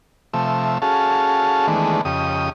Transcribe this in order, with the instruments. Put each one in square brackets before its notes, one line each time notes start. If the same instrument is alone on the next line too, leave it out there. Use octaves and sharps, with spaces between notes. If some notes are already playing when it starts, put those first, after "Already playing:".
[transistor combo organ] C3 F3 A3 E5
C#4 F#4 G#4 A4 F5 A5
D#3 E3 G#3 A3 B3 D4
F2 C#3 G4 D#5 D#6